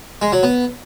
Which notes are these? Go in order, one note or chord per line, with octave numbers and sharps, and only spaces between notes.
G#3
F#3
B3